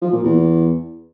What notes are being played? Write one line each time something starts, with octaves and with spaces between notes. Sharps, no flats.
F3
A#2
E2